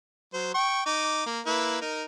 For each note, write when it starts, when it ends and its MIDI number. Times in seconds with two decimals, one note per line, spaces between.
0.34 0.54 54
0.34 0.54 72
0.55 0.81 79
0.55 0.81 85
0.86 1.24 63
0.86 1.24 86
1.26 1.40 58
1.46 1.78 58
1.46 1.78 64
1.46 1.78 71
1.81 2.04 63
1.81 2.04 70